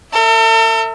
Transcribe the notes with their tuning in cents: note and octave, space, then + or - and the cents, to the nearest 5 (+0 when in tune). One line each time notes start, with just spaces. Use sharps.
A4 +45 E5 -5